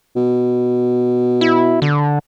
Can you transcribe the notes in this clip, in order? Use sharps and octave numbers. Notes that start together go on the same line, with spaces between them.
B2
E4
D3